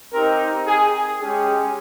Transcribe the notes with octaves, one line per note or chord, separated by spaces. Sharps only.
C4 D#4 G4 A#4
G#4
G#3 C#4 G4 G#4